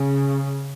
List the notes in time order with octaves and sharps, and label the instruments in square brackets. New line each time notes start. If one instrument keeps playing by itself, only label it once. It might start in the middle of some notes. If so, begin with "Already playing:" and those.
Already playing: [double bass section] C#3